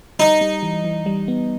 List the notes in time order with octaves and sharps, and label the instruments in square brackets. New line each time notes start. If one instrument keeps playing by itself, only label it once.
[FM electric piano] G3 [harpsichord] D#4
[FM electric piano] G3
E3
E3
G3
B3